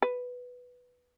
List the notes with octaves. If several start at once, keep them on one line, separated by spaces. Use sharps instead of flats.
B4